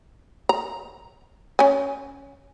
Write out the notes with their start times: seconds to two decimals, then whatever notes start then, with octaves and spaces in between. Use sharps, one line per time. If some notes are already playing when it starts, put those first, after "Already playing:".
0.49 A#5
1.59 C#4 G#5